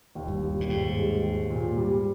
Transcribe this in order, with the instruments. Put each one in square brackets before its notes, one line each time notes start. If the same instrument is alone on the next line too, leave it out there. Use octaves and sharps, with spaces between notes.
[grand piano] D#2
[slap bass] G2
[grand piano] G3
[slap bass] A#2
[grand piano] D#2 [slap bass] G#2
[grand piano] G#3
D#2
A#2
G3